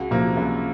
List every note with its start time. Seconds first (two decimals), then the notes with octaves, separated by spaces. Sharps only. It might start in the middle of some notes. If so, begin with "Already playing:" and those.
Already playing: C#2 F#4
0.11 C3 F3 A#3
0.37 C#2